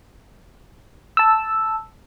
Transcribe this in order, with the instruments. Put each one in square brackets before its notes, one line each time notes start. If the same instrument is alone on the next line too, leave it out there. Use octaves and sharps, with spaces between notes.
[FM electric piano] A5 E6